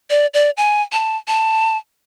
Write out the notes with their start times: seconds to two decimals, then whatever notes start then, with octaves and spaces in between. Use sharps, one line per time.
0.10 D5
0.34 D5
0.57 G#5
0.92 A5
1.28 A5